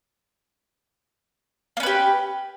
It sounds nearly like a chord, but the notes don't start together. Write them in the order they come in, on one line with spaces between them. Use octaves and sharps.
A#3 C#4 B4 G4